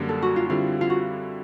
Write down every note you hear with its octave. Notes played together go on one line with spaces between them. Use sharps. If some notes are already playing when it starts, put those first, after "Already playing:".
Already playing: F#2 D3 G3 A#3
A4
F#4
F4
D3 G3 C4 E4 F4
F4
F#4